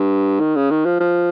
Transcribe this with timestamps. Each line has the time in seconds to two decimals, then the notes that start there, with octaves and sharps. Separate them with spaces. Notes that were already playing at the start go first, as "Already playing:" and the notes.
Already playing: G2
0.40 D#3
0.56 C#3
0.70 D#3
0.85 F3
1.00 F3